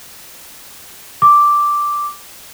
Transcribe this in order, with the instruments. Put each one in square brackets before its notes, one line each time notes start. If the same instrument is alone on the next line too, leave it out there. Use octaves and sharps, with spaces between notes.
[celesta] D6